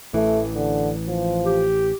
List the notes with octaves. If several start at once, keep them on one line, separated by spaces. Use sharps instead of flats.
A1 E3 A3
D3
F3
G4